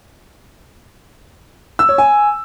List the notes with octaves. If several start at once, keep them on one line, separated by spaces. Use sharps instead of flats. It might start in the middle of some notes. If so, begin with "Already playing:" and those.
E6
C#5
G#5